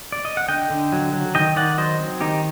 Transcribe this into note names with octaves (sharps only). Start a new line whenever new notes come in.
D5
D#5
F#5
D3 D#5 G5
D3
F#3
F#3
D#3 D#5 G5
D#3 D5 F#5
F#3 C5 D#5
C4
D#3 D#4 G4